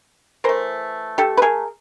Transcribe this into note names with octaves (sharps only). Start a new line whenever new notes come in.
E3 A3 A#4 C5
G4 A4
B4
G#4 A#4